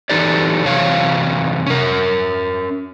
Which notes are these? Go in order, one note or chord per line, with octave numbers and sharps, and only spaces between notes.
E3 F#3 D#4 G4 A4 D5
C3 E3 F#3 C#5 F5
C#4 A#4